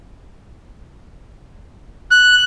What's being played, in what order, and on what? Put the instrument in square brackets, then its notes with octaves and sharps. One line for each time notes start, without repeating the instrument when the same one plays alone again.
[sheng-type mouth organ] F#6